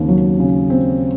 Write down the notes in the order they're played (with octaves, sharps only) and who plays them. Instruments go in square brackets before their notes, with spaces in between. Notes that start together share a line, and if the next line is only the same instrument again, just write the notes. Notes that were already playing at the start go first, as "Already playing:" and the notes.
Already playing: [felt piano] D#2 C#3 C4
F#3
C#3
C4